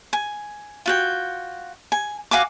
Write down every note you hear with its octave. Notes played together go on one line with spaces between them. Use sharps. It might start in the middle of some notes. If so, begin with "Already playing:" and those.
G#5
F4 F#4 G5
G#5
F#4 F5 G#5 D6